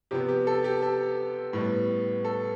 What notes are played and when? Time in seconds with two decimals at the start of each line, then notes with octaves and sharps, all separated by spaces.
0.11 C3 F3 B3 G4
0.28 G4
0.47 A4
0.64 G4
0.82 A4
1.53 A2 G3 B3
2.25 A4